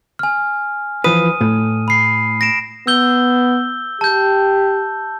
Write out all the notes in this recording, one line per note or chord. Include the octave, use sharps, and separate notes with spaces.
G#5 F6
E3 F3 B4 D#6 D#7
A2
B5 C7
A#6 D7 E7
B3 E6 G6 G7
G4 A5 G6